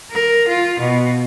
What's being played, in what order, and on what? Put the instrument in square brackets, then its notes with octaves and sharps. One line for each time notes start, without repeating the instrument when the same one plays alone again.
[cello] A#4
F4
B2